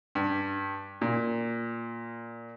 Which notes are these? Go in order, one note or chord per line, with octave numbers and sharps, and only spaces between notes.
G2
A#2